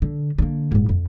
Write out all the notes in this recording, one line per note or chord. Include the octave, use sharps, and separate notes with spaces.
D3
D3 A#3
D#1 G#2
F2